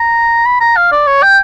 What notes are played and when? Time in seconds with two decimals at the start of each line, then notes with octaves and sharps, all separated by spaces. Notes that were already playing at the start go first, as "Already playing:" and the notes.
Already playing: A#5
0.46 B5
0.61 A#5
0.77 F5
0.92 D5
1.07 C#5
1.23 G5